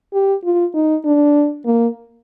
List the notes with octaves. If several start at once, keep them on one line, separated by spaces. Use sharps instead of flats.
G4
F4
D#4
D4
A#3